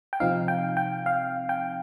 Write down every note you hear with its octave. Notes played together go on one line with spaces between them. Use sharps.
G5
C3 F3 C4 D#4 F5
G5
G5
F5
G5